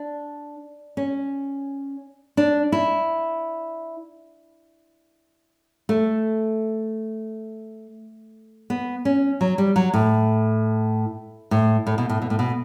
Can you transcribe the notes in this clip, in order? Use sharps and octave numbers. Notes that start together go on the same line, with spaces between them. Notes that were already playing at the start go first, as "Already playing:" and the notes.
Already playing: D4
C#4
D4
E4
A3
B3
C#4
F#3
G3
F#3
A2
A2
A2
B2
A2
B2
A2
B2